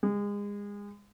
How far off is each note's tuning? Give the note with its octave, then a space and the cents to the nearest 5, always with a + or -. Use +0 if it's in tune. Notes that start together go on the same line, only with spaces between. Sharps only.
G#3 -30